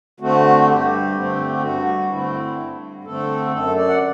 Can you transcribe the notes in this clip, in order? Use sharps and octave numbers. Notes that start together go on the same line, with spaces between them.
D3 A3 C4 F#4
G2 G4
D3 A3 C4
G2 F#4
D3 A3 C4 E4
G2
D3 A3 C4 A4
F#2 A4
D5
F#5